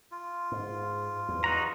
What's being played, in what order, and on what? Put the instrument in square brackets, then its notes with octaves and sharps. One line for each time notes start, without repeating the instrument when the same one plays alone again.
[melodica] F4
[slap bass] G#2
E2
[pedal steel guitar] D#4 F#4 A#5